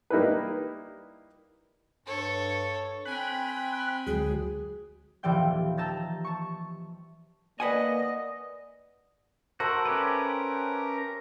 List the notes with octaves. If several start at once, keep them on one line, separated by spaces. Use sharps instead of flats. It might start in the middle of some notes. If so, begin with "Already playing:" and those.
G3 A#3 D#4 E4 G4 B4
G2 A4 C#5
C4 G5 G#5 B5 F#6
D2 F#3 G#3 G#4
D#1 E3 F3 G3 G5 G6
A5 A#5 E6 G6 A6 A#6
A5 C#6
A#3 B4 D5 D#5 F#5 G#5
F#4 A4 A#4 C5 E5
C#4 G4 B4